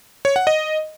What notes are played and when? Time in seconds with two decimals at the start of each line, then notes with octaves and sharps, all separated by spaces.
0.25 C#5
0.36 F#5
0.47 D#5